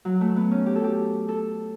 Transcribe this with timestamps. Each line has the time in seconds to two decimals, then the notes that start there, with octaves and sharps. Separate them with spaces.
0.05 F#3
0.21 A3
0.36 B3
0.51 C#4
0.66 G4
0.76 A4
0.84 G4
1.29 A4